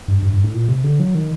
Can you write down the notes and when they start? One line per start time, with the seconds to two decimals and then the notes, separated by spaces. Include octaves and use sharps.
0.08 G2
0.22 G2
0.33 G2
0.44 A2
0.54 A#2
0.69 C3
0.84 D3
1.00 F#3
1.15 D#3